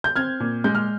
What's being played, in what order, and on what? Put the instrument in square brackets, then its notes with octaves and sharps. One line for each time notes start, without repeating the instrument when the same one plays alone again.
[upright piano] G6
C4 F6 G#6
A#2
G#3 G6
F6